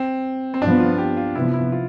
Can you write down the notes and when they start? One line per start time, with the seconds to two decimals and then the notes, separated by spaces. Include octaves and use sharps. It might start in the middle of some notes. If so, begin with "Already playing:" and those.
Already playing: C4
0.54 C4
0.61 G2 F3 B3 D4
0.80 F4
0.98 G4
1.17 F4
1.35 C3 F3 B3 E4
1.54 E4
1.72 F4